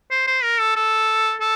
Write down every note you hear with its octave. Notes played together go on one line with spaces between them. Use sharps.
C5
C5
A#4
A4
A4
A4